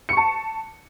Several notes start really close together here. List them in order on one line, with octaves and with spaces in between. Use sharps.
C#7 C#6 A5